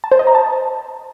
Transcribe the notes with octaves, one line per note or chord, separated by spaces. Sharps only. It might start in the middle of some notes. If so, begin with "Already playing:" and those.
A5
C5
D#5
A#5
A5